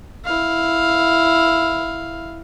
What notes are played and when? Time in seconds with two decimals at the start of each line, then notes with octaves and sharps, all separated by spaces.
0.25 E4 F5